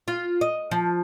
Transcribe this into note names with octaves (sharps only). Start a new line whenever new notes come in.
F4
D#5
F3